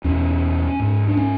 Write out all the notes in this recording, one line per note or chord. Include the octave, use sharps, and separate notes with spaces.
E2 B2 C#4
G#2
D4
C#4